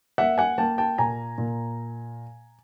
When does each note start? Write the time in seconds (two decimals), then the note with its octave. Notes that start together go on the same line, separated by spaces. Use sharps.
0.18 A#3 E5 F#5
0.38 F#5 G#5
0.58 A#3 G5 A5
0.78 G5 A5
0.98 A#2 G#5 A#5
1.38 A#2